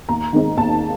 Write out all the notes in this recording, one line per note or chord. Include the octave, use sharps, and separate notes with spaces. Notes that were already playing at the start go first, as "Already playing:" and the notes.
D#2 A#5
D#3 G#3 C4 D#4
D#2 A5